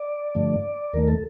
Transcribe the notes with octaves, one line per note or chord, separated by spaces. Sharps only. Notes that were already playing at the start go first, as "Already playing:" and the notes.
Already playing: D5
G2 D3 F3 A3
D#2 D#3 A3 A#4
A4